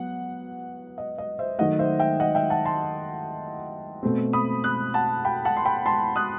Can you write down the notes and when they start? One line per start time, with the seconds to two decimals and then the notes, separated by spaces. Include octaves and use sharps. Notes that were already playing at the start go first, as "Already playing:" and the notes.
Already playing: F#3 B3 F#5
0.98 D#5
1.18 D#5
1.39 C5 E5
1.58 D#3 F#3 A3 D#5 F#5
1.79 C5 E5
2.00 E5 G5
2.20 D#5 F#5
2.35 E5 G5
2.50 F#5 A5
2.65 A5 C6
4.03 B2 A3 C4
4.33 B5 D#6
4.64 D#6 F#6
4.94 F#5 A5
5.25 G5 B5
5.45 F#5 A5
5.57 C6
5.65 G5 B5
5.86 A5 C6
6.16 D#6 F#6